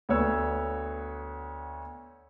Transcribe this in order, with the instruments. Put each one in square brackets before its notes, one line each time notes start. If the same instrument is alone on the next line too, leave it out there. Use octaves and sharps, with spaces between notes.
[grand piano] D2 B3 C#5 E6